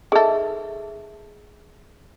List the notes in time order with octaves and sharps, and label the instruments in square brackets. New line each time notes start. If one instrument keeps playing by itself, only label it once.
[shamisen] D#3 A4 [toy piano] G#4 E5